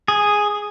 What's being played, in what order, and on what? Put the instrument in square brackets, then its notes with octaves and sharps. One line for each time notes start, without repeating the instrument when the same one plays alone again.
[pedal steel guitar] G#4